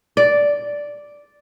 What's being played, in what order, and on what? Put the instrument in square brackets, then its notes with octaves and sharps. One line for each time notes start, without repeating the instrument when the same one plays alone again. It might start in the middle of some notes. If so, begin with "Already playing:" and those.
[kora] D5